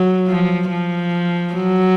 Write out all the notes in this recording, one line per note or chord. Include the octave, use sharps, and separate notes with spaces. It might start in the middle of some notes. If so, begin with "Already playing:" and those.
Already playing: F#3
F3
F3
F#3